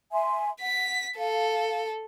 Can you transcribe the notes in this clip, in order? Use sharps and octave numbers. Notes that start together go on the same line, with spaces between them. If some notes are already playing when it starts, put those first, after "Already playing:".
E5 G#5 C6
F#5 B6
A4 F5